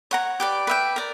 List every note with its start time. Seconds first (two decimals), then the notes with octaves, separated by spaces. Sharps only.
0.11 C#5 F#5 A#5
0.40 G4 B4 D5
0.67 B4 E5 G5
0.96 A#4 D5